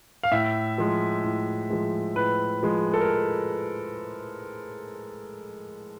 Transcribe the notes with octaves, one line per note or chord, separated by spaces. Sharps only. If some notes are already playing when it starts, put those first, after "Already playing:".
F5
A2 E5
F3 G#3
A2
F3 G#3
A2 B4
F3 G#3
A4
A#4